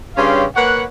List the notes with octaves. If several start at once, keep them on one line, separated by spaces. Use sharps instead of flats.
G2 C#3 C#4 G4 F5 C6
A#3 B4 C#5 F#5